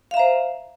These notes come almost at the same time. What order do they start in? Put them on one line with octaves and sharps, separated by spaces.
F5 E5 A#5 C5